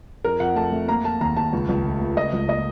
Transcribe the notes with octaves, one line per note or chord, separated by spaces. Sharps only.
F2 A#4
F2 F#5
A3 A5
A3
A#3 A#5
A#3 A5
D#2 A#5
D#2 A5
C#2
C#2
A3
A3
C#2 D#5
C#2
A#3 D#5